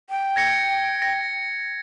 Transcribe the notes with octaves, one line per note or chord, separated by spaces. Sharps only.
G5
G#6 A#6 C#7
A#6